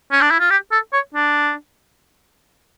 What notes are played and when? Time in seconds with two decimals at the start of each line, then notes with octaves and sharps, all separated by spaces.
0.12 C#4
0.21 D4
0.31 E4
0.40 F4
0.50 G4
0.72 A4
0.93 C#5
1.14 D4